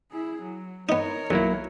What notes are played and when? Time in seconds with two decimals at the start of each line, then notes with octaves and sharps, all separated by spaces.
0.11 E4 G#4
0.42 F#3
0.89 B3 D#4 A#4 C#5
1.30 B1 F#3 A#3 E4